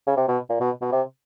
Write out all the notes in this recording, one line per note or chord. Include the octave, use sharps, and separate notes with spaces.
C#3
C3
B2
A#2
B2
B2
C3